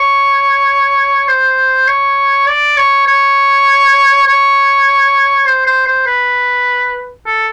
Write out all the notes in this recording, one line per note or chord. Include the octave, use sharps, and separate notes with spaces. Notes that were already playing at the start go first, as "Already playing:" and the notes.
Already playing: C#5
C5
C#5
D5
C#5
C#5
C#5
C5
C5
C5
B4
A4